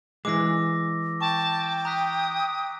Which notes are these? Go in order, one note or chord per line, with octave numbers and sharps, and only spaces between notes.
E3 G#3 D6 E6 A#6
G5 A5 C#6
A#5 D#6 F#6 B6